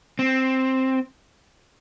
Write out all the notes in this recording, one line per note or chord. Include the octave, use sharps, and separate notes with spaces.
C4